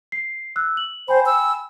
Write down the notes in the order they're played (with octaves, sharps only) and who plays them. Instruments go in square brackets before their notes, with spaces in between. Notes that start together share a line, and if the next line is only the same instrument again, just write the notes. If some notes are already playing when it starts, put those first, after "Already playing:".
[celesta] C7
E6 F#6
F#7
[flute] C5 [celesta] G5 G#5 B5
[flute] E6